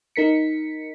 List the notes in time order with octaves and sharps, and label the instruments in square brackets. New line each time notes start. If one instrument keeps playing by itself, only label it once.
[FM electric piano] D#4 A#4 B6 C#7